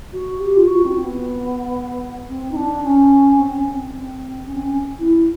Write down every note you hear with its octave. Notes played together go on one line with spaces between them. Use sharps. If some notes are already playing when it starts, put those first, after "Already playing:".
F#4
G4
F4
F#4
C4
B3
C4
D#4
D4
C#4
C4
C#4
C4
C#4
C4
C#4
E4